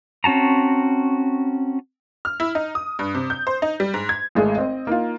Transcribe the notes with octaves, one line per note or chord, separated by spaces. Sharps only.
C4 C#4 F#4 A5 A#5
F6
E4
D#4
D#6
G2
C3
G6
C5
D#4
G3
G#2
G#6
G#1 G#3 A3 G#4
C4 D#5
A#3 D#4 F4